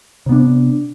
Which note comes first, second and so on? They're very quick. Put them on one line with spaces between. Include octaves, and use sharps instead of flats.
C3 B3 D4